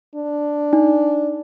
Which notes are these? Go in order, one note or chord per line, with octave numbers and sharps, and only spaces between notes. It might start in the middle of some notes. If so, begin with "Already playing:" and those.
D4
D#4